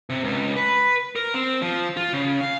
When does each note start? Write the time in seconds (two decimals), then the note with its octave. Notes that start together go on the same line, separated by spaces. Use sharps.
0.10 C3
0.24 C#2
0.56 B4
1.16 A#4
1.34 C4
1.62 F3
1.97 F4
2.13 C#3
2.41 F5